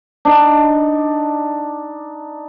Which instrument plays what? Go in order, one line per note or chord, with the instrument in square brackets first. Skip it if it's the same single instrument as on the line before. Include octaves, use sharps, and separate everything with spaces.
[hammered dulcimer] D4 D#4